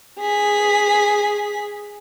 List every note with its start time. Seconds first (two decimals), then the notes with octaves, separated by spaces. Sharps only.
0.21 G#4 B6